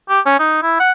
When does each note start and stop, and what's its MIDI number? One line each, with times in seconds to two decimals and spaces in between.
0.10 0.21 67
0.26 0.39 61
0.40 0.60 63
0.63 0.79 64
0.80 0.92 78